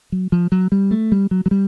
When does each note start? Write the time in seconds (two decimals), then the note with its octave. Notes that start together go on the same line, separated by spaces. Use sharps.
0.12 F#3
0.32 F3
0.52 F#3
0.72 G3
0.91 A3
1.12 G3
1.31 F#3
1.46 F#3
1.51 G3